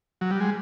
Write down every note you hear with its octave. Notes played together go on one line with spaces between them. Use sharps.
F#3
G3
G#3